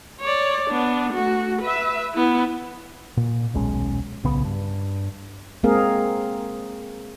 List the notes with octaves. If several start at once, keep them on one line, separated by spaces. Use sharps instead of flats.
C#5 D5
B3 D4
A3 F#4
B4 E5
B3 E4
A#2
D#1 B1 G#3 C#4
D1 B1 C#3 B3
G2
G#3 A#3 C4 G#4 A#4 F5